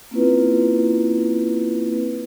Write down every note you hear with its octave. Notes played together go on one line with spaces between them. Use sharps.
A#3 C4 C#4 E4 F4 B4